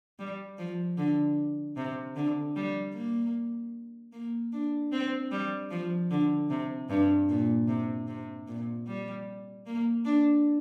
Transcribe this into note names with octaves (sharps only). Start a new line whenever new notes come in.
G3
F3
D3
C3
D3
G3
A#3
A#3
D4
C4
G3
F3
D3
C3
G2
A#2
C3
C3
A#2
G3
A#3
D4